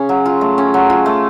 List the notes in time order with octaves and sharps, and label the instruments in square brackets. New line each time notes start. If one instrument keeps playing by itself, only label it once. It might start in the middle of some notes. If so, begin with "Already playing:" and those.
Already playing: [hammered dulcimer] C#3 C#4
F#3
F4
A3
C#4
F#3
F4
A3